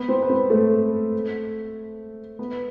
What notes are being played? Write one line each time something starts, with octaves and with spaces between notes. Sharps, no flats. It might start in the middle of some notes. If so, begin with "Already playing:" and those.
Already playing: B3 B4
C4 C5
B4
C4 C5
A3 A4
B3 B4